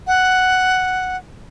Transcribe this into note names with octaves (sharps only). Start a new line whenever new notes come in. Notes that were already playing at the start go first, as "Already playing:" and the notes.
F#5